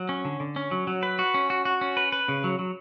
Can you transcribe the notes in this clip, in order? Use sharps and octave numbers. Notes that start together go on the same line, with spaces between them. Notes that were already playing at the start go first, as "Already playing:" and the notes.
Already playing: F#3
C#4
D3
D3
C#4
F#3
F#3
B4
F#4
C#4
F#4
F#4
C#4
B4
B4
C#3
F#3
F#3